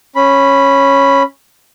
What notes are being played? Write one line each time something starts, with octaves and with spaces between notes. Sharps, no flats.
C#4 B5